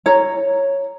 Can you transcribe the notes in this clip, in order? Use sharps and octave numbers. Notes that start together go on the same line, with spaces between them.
C#5 A#5